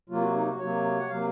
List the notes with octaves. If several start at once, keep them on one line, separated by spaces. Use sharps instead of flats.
C3 F#3 A#3 F4
F#4
D#4
F#4
C3 F#3 A#3 C#5
F#5
C3 F#3 A#3 F5